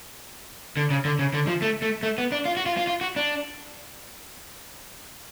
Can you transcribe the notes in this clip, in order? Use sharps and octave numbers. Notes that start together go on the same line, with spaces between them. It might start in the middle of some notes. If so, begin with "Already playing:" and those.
D3
C#3
D3
C#3
D3
F3
A3
A3
A3
B3
D4
F4
F#4
F4
F4
F4
F#4
D4